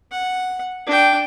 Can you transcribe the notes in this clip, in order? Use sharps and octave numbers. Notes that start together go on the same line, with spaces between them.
F#5
D4 G5